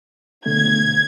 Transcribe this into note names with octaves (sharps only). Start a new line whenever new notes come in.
B2 D3 A3 G#6